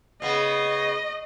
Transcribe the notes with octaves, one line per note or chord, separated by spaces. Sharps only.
C#3 B3 D#5